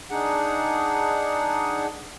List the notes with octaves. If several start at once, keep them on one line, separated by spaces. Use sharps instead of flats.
D4 D#4 G#4 F#5